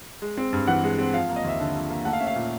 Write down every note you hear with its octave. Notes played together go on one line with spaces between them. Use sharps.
G#3
C4
G2
E3 F#5
G#3
C4
F3 F5
A#3
D#5
D#2 E5
D3
F3
A#3
A3 F#5
F5
C#4 E5
F5
A#2